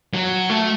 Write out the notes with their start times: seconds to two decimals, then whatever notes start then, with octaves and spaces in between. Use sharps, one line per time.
0.14 F#3
0.50 A3